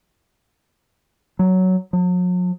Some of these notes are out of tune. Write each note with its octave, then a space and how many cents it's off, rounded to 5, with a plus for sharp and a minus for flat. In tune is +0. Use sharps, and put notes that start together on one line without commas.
F#3 +5
F#3 -45